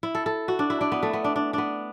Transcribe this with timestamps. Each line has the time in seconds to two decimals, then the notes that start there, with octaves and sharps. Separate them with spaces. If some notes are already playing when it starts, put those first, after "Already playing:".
0.03 E4
0.15 A4
0.26 A4
0.48 F#4
0.59 D4
0.70 E4
0.81 D4
0.92 B3
1.03 A3
1.13 B3
1.24 D4
1.36 D4
1.53 B3 D4